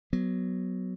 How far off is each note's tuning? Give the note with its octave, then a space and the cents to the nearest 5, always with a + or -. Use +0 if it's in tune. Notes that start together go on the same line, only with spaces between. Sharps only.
F#3 +5 B3 +0